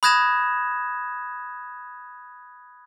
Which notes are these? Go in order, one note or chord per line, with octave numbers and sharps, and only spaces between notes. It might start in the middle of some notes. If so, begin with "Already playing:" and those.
B5 D#6 F#6 G#6 A#6 E7